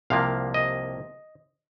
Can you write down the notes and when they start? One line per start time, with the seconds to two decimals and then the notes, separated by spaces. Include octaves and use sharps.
0.10 C2 C3 F3 A#3 F5
0.54 D#5